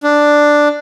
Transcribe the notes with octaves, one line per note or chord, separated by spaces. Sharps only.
D4